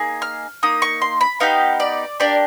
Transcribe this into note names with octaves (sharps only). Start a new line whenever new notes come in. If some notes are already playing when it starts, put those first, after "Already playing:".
Already playing: A#3 D#4 G#4
F6
A#3 D#4 D#6
C#6
C6
B5
B3 D#4 G4 F5
D5
A#3 D4 G4 D5